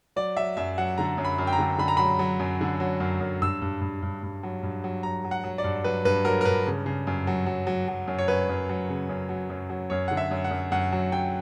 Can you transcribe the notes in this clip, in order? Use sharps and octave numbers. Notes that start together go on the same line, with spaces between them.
F#3 D5
F#3 E5
F#2 E5
F#3 F#5
D3 A#5
F#2
B5
F#2
G5
A#5
D3
D3 B5
A#5
F#3 B5
F#3
F#2
D3
F#3
F#2
F#2
G2 E6
G2
G2
G2
G2
F#3
G2
F#3
F#3 A#5
F#3
F#5
F#3
D5
G2
F#3 B4
G2 B4
F#3 A#4
A#4
G2 B4
C#3
C#3
F#2
F#3
F#3
F#3
F#3
F#2
C#5
F#2 B4
F#2
F#3
C#3
F#2
F#3
F#2
F#3
F#2 C#5
D3 F#5
E5
F#2
F#5
F#2
F#2 F#5
F#3
F#3 G5